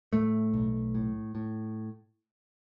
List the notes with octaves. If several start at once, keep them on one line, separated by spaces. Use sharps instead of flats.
A2 A3
B1
A2
A2